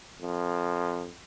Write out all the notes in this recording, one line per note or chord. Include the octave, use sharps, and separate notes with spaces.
F2